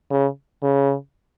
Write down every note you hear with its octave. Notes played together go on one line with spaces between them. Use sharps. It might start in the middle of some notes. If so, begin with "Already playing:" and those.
C#3
C#3